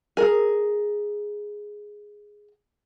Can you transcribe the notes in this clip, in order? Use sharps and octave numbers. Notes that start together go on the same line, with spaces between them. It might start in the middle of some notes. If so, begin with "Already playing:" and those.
G#4 A#4